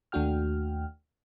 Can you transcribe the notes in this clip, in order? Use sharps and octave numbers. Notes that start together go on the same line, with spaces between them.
D#2 A3 D4 F#4 G5 F6